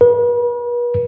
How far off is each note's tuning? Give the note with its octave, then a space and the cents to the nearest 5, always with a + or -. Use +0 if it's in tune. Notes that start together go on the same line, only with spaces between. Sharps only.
B4 -40